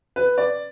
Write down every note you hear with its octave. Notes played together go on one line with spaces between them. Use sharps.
B4
D5